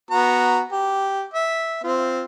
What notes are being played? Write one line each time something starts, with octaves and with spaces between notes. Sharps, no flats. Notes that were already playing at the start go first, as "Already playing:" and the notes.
B3 F#4 A#5
G4
E5
C4 F4